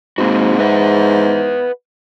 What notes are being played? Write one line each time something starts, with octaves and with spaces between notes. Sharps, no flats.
G#2 A#3 C4 F#4
B4 E5 F#5